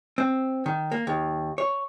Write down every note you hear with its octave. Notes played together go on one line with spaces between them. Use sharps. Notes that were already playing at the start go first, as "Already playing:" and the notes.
C4
D#3
A#3
D#2
C#5